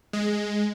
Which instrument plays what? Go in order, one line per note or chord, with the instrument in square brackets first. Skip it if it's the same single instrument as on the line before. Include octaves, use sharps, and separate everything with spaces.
[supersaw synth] G#3